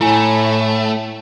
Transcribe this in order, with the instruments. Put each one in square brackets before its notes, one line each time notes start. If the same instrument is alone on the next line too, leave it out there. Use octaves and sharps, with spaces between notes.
[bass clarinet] A2 [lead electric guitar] A3 [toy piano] E4 G#5